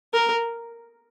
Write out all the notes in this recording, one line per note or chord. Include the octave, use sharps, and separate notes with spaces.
A#4